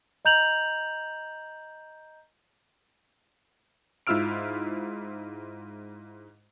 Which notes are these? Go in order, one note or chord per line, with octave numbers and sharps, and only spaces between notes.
D#5 A#5 G6 F7 F#7
G#2 E4 F4 E6 F6 D7